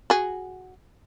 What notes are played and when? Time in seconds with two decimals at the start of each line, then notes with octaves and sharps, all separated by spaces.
0.10 F#4 G#4